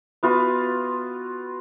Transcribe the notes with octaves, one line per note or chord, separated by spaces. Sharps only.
B3 F4 F#4 B4